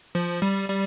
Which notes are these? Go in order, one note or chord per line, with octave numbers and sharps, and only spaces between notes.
F3
G3
G3